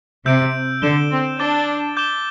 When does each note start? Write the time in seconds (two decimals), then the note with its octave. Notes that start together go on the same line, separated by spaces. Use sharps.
0.26 C3 E6 G6 D7
0.82 D3 G6 E7 G7
1.11 C4
1.39 D4 D6 A6 E7 G7
1.97 D6 G6 E7 G7